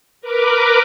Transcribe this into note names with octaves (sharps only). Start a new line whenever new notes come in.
A#4 B4 D6